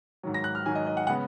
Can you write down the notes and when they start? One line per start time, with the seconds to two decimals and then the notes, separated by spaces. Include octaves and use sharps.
0.23 G#2 D#3 F#3
0.34 A#6
0.44 F#6
0.55 F6
0.66 G#2 D#3 F#3 G#5
0.75 D#5
0.87 D#5
0.97 F#5
1.07 C#3 G#3 B3 F#5